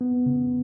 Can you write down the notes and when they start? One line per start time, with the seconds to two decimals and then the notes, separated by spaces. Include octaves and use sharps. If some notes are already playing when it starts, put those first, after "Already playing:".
0.01 B3
0.26 C#3